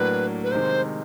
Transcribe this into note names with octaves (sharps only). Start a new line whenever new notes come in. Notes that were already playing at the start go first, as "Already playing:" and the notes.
Already playing: A2 F#3 A#3 D4 B4
B4
C3 D#3 G#3 C5